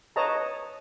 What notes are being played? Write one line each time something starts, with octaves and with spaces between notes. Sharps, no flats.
B4 C#5 D#5 A5 A#5